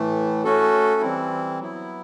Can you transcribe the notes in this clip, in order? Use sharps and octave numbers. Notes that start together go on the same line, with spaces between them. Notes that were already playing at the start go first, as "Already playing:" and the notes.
Already playing: A2 E3 A3
A3 C#4 F#4 A4
E3 G3 C4 E4
F#3 B3 E4